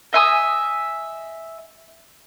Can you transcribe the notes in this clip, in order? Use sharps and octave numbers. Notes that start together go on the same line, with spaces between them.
D#5 E5 G#5 D#6